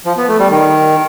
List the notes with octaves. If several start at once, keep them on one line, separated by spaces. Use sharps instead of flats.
F3
B3
A3
G3
D#3